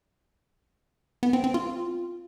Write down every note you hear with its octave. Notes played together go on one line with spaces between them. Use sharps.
B3
C4
C4
F4